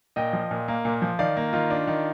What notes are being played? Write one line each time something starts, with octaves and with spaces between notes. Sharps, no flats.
A#2 D#5 G5
F3
A#2
A#3
A#2
F3
D#3 D5 F5
A#3
D#3 F4
D4
D#3